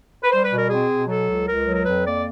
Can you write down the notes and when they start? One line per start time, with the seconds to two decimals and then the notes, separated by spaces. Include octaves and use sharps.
0.23 B4
0.30 G3 C5
0.44 B4
0.51 B2
0.57 A#4
0.69 C4 G#4
0.89 B2
1.08 F#3 A4
1.27 C#2
1.47 C#2 A#4
1.66 F#3
1.75 A#4
1.86 F2 B4
2.06 A#3 D5